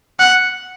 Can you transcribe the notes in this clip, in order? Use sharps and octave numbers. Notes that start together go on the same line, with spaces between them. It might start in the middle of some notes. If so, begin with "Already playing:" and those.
F#5